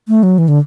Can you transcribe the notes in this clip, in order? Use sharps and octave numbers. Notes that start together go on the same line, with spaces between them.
A3
F#3
E3
D3